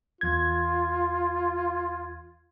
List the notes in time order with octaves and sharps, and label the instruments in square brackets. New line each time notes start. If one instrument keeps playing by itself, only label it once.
[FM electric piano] E2 G#6 [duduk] F4